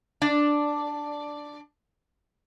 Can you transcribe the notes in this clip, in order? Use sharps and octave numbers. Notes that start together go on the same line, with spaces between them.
D4 D5